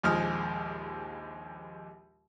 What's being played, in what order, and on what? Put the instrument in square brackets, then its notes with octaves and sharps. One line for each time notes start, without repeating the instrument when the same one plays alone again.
[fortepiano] A#1 D#2 F3 G#3 D#6 F6